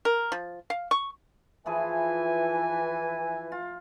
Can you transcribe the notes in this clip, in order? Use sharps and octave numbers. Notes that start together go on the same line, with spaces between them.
A#4
F3
F5
C#6
E3 F3 E4 G#4 G#5
F4